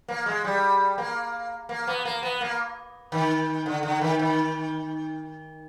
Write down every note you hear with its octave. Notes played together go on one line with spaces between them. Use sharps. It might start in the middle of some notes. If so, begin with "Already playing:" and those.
A#3
G#3
G3
A#3
A#3
B3
A#3
B3
A#3
D#3
D3
D3
D#3
D#3